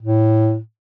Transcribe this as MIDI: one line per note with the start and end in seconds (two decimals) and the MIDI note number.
0.02 0.58 45